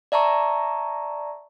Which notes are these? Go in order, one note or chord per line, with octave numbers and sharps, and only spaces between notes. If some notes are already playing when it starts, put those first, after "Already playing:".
D5 E5 A5 A#5 C#6